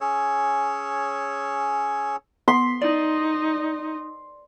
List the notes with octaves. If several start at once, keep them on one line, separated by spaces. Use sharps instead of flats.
C#4 G#4 C#5 E6
B3 C6 B6
D#4 D5